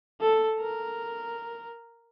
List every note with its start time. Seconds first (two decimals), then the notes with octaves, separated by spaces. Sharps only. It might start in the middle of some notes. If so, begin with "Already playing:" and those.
0.21 A4
0.60 A#4